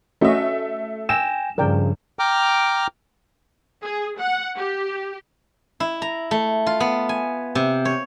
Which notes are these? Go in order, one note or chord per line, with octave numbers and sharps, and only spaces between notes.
A3 C#4 F#4 D#5 E5
G5 G#5 E6 A#6 E7
G2 C#3 F3 A#4 D5 G5
G5 A#5 D6 F6
G#4
F#5
G4
E4
A#5
A3
F4
B3
G#5
C3
C#5